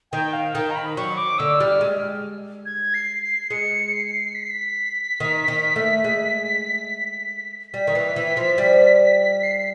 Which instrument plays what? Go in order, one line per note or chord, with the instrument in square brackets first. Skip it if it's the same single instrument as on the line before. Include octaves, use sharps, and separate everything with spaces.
[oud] D#3 [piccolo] G5
[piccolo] F5
[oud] D#3 [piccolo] G5
[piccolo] A#5
B5
[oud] F#3 [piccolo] C#6
[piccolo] D6
[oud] D3 [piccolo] E6
[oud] G3 [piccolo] F6
[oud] G#3
[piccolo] G#6
C7
C7
[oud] G#3 [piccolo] C#7
[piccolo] C7
B6
C7
B6
[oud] D#3
D#3
A3
G#3
[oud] G3 [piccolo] B6
[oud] D#3
E3
E3
F3
G3
[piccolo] C7
C7